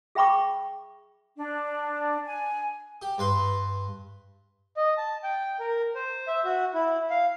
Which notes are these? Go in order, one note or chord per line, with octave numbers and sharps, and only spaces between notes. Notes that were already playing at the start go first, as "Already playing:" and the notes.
G#4 E5 G5 B5 C#6 D6
D4
G#5
G4
G2 B4 C6
D#5
A5
G5
A#4
C5
E5
F#4
E4
F5